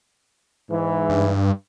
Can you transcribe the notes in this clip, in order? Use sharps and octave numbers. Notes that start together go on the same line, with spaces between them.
G#2 E3
G2